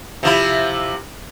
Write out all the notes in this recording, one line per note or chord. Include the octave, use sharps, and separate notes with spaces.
C3 F3 E4